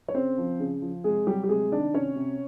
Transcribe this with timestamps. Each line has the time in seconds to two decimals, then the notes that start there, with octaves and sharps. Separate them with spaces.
0.08 C#5
0.14 C#3 C4 C5
0.38 F3
0.60 C#3
0.82 F3
1.04 C3 G#3 G#4
1.27 F#3 G3 G4
1.44 G4
1.49 C3 G#3 G#4
1.71 D#3 D4 D5
1.94 C3 C#4 C#5
2.16 C3